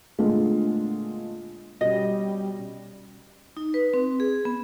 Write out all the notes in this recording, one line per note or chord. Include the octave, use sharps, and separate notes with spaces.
A#2 D3 G#3 A3 B3 F4
B2 G3 C#4 D#5
D#4
B4
C4
G#4
B3